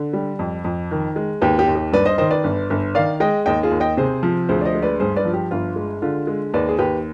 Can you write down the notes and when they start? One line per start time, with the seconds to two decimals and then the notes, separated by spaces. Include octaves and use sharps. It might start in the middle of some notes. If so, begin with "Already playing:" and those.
Already playing: D3
0.13 G3
0.39 F2
0.64 F2
0.91 D#3
1.16 G#3
1.41 D#2 G4 B4
1.59 G4
1.68 D#2
1.75 G4
1.92 G2 B4 D5
2.05 C5 D#5
2.18 D#3 C5 D#5
2.31 B4 D5
2.44 G1
2.70 G1
2.95 D#3 D5 F5
3.20 G#3 D#5 G5
3.46 D#2 D#5 G5
3.63 F4 G#4
3.71 D#2
3.80 D#5 G5
3.97 C3 G#4 C5
4.23 F3
4.49 D2 G#4 C5
4.61 D5
4.65 C5 D#5
4.75 G#3
4.83 B4 D5
5.00 G2 G#4 C5
5.16 B4 D5
5.25 F3
5.33 G4
5.51 G1 F4
5.76 G#3
6.02 D3 F4
6.27 G#3
6.54 D#2 B4 D5
6.68 G#4
6.78 D#2 G4 B4